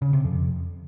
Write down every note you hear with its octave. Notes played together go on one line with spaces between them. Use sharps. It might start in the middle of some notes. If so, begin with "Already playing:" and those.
C#3
C3
F2